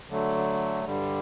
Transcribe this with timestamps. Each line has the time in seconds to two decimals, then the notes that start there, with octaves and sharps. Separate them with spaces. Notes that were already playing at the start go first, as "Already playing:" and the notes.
0.09 D3 F#3 A3
0.85 G2 D3 G3